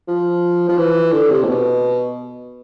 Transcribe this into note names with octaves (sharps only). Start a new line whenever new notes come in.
F3
F3
E3
D3
C3
A2
B2